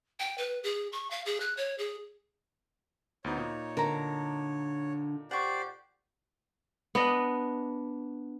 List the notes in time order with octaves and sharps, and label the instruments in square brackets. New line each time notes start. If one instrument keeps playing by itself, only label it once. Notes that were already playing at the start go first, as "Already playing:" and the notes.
[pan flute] G5
B4
G#4
C#6
F5
G#4
F#6
C#5
G#4
[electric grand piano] D2 B3 D#4 [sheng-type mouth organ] C#5
[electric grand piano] A#2 D#4
[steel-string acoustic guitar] D3 [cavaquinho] A#4 A#5
[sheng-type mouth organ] G4 C5 D5 [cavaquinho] F#5 C#6
[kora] B3 D4 D#5